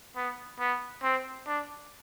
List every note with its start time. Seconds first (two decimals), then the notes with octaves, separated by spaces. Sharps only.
0.16 B3
0.60 B3
1.03 C4
1.47 D4